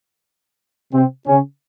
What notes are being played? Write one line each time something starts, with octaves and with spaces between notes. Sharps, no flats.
C3 C4
C#3 C#4